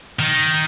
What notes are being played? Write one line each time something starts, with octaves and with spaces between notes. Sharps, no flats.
D#3